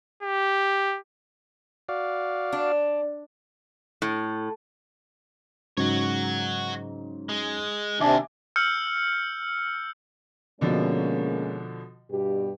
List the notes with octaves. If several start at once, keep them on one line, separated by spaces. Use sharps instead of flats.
G4
F#4 D5 F5
D4
A2
G#2 C#3 F#3 F#4 C#5
G#3
D#2 C3 D4 E5 G#5 D6
E6 F6 G6 C#7
B2 D3 F3 G#3 A#3 C#4
G2 B2 G4